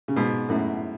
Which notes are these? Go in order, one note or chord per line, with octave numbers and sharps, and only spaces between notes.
C#3
G#2 B2
F#2 A2